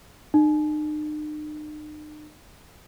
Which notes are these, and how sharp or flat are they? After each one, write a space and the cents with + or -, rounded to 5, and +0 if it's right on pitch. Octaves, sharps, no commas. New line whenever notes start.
D#4 -45